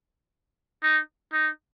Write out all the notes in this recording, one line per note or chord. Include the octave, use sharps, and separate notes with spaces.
D#4
D#4